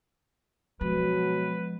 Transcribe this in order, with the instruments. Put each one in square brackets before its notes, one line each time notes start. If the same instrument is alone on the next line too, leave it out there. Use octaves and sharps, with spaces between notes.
[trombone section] B2 F#3 [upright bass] F3 G#3 [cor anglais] B4